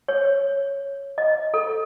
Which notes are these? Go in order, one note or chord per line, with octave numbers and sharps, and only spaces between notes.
C#5
D#5
A4